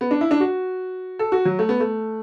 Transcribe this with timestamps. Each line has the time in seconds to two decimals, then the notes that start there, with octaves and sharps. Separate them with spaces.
0.01 B3
0.11 D4
0.21 E4
0.31 D4
0.40 F#4
1.19 A4
1.32 F#4
1.45 F#3
1.59 A3
1.69 B3
1.80 A3